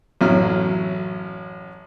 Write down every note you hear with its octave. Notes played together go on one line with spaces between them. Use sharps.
A1 F#2 F#3 E4 F6